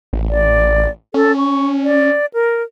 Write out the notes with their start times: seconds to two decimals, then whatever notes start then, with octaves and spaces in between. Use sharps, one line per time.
0.13 A1
0.30 D5
1.14 C#4 A4
1.37 C#6
1.83 D5
2.34 A#4